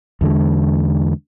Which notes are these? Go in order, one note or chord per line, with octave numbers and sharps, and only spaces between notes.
E2 D3 G#3